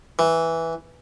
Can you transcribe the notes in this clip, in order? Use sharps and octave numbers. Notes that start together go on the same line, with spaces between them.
E3